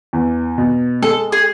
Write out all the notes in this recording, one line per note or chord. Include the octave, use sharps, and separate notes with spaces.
E2
B2
G#3 A4
G#4